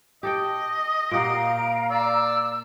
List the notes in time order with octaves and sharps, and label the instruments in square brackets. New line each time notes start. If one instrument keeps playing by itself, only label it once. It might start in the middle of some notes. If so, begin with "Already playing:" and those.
[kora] G4 A4 G5 [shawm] D#5
[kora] A#2 G4 F#5 [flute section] F5 A#5 [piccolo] D7
[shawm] D5 [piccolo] E6